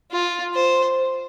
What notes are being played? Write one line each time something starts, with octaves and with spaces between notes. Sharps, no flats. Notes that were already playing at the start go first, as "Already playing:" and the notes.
F4
C5